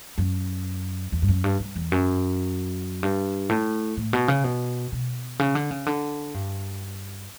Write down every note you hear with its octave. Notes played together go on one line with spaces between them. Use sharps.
F#2
E2
G2
F#2
G2
G2
E2
F#2
G2
A2
A2
B2
C#3
B2
B2
C#3
D3
C#3
D3
G2